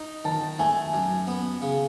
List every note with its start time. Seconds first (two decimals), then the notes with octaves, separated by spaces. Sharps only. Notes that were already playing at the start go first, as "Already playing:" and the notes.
Already playing: D#4
0.25 D#3 A5
0.59 A3 G#5
0.93 F#2
1.27 B3
1.62 C#3